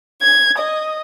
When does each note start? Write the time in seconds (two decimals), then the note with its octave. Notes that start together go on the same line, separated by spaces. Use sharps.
0.20 G#6
0.57 D#5